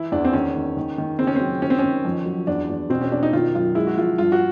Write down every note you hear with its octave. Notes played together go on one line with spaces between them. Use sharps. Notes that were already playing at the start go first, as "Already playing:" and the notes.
Already playing: E3 E4
E2 D4
C4
D#3 C#4
D#3
D#3
D#3
C#3 C4
C#4
F#3 C4
D#3 C#4
C4
D#3 C#4
F2
F#3
E2 D4
E2
B2 C4
C#4
B2 D4
D#4
D#3 F4
F#2 F4
G#3 E4
F#4
F3 F4
G2 F4
F#4